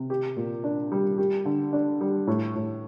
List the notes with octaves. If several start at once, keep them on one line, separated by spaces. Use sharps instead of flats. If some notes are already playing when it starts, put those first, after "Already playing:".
Already playing: C3
G4
A#2
D4
G3
G4
D3
D4
G3
A2
A2